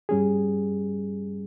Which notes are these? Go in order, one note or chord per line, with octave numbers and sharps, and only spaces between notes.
G2 G3 C#4 G#4